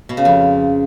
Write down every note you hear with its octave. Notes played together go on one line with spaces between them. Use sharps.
B2
C#3
F2